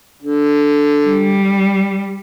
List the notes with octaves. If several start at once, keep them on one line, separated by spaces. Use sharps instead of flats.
D3
G3